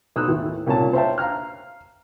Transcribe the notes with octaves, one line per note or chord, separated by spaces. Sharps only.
B1 D#6 E6 F#6
D#2 A2 E3
C2 A#2 C#3 C#5 A5
C5 C#5 E5 F5 G5 A5
F5 A#5 F6